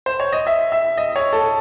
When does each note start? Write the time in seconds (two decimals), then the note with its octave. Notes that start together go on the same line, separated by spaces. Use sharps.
0.06 C5
0.20 C#5
0.33 D#5
0.47 E5
0.72 E5
0.98 D#5
1.16 C#5
1.33 A4